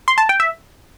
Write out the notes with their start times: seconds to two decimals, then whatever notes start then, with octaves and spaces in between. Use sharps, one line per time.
0.08 C6
0.18 A5
0.29 G5
0.40 E5